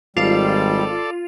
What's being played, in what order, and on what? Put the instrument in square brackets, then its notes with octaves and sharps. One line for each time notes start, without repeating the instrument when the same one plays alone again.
[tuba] G#1 [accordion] G3 [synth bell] F4 [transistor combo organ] A4 D5